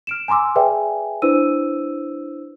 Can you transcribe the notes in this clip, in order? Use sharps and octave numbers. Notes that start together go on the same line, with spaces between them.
F6 D7 E7
G#5 A#5 C6 D6 E6
G#4 B4 D5 E5 G5 G#5
D4 E4 B4 C5 E6 D#7